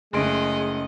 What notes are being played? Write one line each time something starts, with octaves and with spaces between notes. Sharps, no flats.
F#1 G#3 A3 C#4 D#5 C6 D7